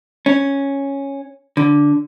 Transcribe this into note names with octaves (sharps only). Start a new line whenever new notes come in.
C#4
D3